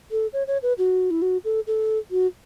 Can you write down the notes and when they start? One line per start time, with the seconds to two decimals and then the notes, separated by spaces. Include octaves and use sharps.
0.11 A4
0.33 C#5
0.47 C#5
0.63 B4
0.78 F#4
1.11 E4
1.22 F#4
1.45 A4
1.67 A4
2.11 F#4